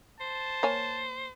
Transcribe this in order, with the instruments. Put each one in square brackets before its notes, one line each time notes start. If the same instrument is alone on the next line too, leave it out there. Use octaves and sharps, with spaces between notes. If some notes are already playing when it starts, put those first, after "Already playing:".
[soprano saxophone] C5 [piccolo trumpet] A5
[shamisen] A#3 C#5 G#5